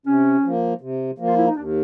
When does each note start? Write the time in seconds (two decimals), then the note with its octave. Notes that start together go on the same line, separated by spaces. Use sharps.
0.06 C3 C#4
0.44 F3 A#3
0.81 C3
1.19 F3 A#3
1.27 F4
1.37 E4
1.46 D#4
1.56 D#2 D4